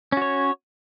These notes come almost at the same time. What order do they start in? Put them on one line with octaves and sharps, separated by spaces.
C#4 F#4 C#5